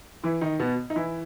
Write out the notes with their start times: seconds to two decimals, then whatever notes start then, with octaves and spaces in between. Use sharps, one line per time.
0.24 E3 E4
0.41 D#3 D#4
0.60 B2 B3
0.90 D#4
0.96 E3 E4